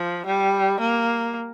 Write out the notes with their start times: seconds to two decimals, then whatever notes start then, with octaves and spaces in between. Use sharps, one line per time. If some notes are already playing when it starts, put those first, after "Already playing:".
Already playing: F3
0.26 G3
0.80 A#3